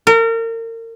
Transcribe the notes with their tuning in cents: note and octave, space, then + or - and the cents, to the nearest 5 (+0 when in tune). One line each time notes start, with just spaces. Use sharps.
A#4 -35